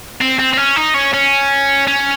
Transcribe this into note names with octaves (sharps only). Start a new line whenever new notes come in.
C4
C4
C4
C#4
D#4
C#4
C#4
C#4